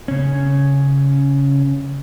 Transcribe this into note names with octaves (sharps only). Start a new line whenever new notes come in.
C#3 C#4